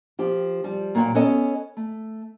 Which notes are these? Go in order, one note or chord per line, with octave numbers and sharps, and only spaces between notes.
F3 G4
F3 G3
A#2 F#3 G5
B3 C#4 A4 C#5 D#5
A3